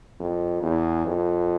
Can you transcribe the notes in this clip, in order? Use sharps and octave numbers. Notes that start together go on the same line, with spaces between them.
F2
E2
F2